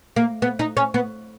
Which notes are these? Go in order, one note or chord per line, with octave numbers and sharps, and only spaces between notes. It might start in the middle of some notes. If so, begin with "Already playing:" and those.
A#3
B3
D#4
C#4
B3